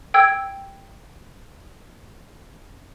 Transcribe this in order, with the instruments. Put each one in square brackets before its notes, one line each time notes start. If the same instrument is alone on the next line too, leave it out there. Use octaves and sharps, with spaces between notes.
[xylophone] G5 E6 G#6